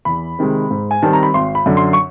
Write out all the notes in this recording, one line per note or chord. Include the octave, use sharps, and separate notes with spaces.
E2 B5
C3 D#3 G#3
G#2
G#5
D#3 G3 C4 A5
A#5
B5
G#1 C6
B5
F#2 D3
C6
C#6